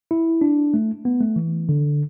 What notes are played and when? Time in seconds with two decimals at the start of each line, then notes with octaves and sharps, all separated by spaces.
0.11 E4
0.41 D4
0.74 A3
1.05 B3
1.21 A3
1.36 E3
1.69 D3